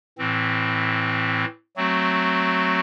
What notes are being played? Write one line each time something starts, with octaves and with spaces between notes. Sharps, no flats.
A2 E3 C4
F#3 A3 C4 F#4